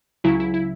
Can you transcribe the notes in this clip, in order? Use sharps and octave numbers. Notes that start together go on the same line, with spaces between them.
C#2 C#3 F#3 E4
E4
E4